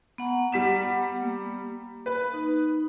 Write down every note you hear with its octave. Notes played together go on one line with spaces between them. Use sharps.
B3 F#5 A#5
G3 B6 E7
A#3
B4
D#4